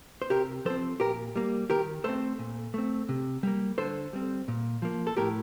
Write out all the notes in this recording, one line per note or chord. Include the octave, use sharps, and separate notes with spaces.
C5
C3 G4 A#4
F3 C4 A4 C5
A#2 G4 A#4
G3 A#3
D#3 G4 A#4
A3 C4 A4 C5
A#2
A3 C4
C3
G3 A#3
D3 A4 C5
G3 C4
A#2
F3 A#3
A4
A2 G4 A#4